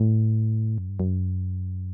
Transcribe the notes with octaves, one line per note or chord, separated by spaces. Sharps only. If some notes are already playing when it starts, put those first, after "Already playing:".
Already playing: A2
F#2
G2
F#2